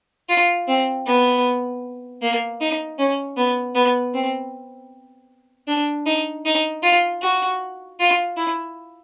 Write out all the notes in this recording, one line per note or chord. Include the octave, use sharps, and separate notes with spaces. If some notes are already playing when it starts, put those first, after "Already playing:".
F4
C4
B3
A#3
D#4
C#4
B3
B3
C4
D4
D#4
D#4
F4
F#4
F4
E4